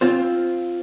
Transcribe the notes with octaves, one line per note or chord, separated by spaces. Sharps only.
C4 F4 C5